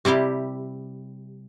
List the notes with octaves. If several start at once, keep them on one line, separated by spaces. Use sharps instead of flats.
C3 G3 E4 G4